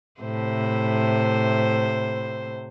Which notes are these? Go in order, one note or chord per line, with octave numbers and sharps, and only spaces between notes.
A2 C3 C5